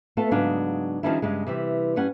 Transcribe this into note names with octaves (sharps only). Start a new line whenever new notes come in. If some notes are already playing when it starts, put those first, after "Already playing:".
A3 B3 F4 A4
G#2 C#3 F#3 B3 D4 F5
D#3 F3 G3 C#4 D4 E4
G2 C#3 G#3
C3 E3 G3
G2 G3 C#4 F#5